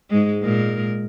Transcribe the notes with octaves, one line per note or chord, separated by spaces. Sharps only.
G#2 G#3
A#2 G#3 A#4